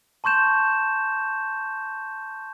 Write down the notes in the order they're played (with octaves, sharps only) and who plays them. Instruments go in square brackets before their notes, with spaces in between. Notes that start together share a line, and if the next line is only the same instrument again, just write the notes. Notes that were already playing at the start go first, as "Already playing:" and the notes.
[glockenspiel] A5 C6 C#6 G6 E7